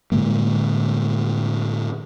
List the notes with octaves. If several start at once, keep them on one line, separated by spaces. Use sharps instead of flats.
A2 D3 G#3 A#3